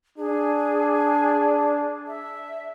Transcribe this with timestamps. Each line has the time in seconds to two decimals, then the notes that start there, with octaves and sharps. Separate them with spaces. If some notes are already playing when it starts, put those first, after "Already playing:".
0.18 D4 G#4
2.07 E5